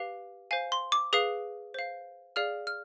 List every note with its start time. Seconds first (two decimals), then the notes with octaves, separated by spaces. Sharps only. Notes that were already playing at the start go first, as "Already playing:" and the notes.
Already playing: G4 B4 F5
0.51 C5 F5 G#5
0.72 C6
0.92 D6
1.13 G#4 B4 F5 D#6
1.74 C5 F5
2.36 G#4 D5 F5 F6
2.67 F6